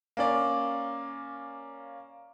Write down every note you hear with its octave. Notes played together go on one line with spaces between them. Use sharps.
A#3 C#4 D5